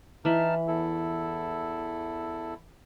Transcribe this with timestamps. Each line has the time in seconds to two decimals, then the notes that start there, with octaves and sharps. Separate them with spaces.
0.25 E3 D#4 A5 B5 F6
0.68 E2 E4 A4